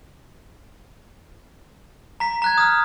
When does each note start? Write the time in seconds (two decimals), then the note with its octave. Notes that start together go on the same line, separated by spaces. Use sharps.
2.20 A#5 B6
2.42 A#5 F#6 G#6
2.58 D#6 F6